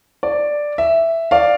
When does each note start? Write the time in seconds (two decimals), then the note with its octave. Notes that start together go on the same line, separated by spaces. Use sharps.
0.23 D5
0.78 E5
1.31 D5 F5